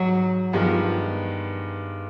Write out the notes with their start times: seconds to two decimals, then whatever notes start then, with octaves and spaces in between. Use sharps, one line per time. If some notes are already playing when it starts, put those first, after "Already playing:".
Already playing: G#2 F#3
0.52 G2 D#3 F3 G#3 B3